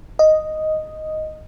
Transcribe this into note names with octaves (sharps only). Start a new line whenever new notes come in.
D#5